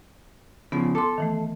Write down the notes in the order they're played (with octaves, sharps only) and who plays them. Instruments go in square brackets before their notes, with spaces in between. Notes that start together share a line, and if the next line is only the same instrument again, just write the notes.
[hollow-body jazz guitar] C#3 F3 [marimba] B3
[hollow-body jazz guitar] A4 [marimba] C6 D6
[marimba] D#3 E3 A3